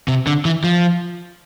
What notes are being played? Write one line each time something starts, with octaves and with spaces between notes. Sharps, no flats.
C3
D3
E3
F3